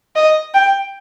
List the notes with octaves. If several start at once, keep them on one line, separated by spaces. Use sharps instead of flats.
D#5
G5